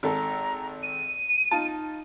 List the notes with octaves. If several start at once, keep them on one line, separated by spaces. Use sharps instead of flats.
G#1 A4 A#5
D#7
D#4 F4 A5